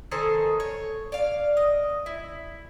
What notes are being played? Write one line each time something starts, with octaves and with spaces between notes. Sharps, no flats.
D#3 A4 C5 G#5
C#5
D5 F5
D#5
E4